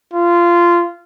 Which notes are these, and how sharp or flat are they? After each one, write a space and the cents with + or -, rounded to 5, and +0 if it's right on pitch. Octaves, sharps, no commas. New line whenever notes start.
F4 -15